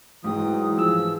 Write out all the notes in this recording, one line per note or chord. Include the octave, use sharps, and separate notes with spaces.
G#2 E3 F#3 G5 D#6
F3 G#4 E6 E7